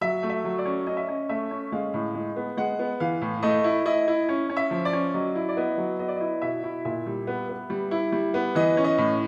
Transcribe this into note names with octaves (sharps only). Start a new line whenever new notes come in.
F#3 E5
A3
E5
F#3
D5
C#4
C#4 D#5
E5
C#4 D#5
A3 E5
C#4
G#3 F5
A2
G#3
B3
G#3 F#5
B3
E3 F5
A2
A3 D#5
E4
E4 D#5
E4
C#4
C#4
E5
F3
D5
C#4
F#3 D#5
E4
D5
B3 D#5
F#3
B3 D#5
D5
E4 D#5
B2 E5
E4
A#2 E5
G3
B3
B3
G3
E4
G3
B3
E3 D#5
C#4
D#5
A2